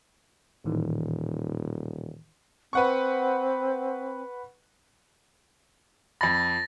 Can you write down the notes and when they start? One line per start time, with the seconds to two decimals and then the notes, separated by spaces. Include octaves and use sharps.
0.65 D#1 A2 D#3 E3
2.73 C4 B4 F#5 C#6
6.21 F2 B5 A6 A#6